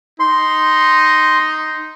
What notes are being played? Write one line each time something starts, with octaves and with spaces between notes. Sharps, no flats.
D#4 C6